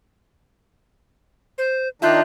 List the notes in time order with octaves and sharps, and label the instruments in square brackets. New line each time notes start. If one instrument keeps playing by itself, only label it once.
[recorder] C5
[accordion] D#3 D4 D#4 [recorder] F4 [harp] E5 F#6 G6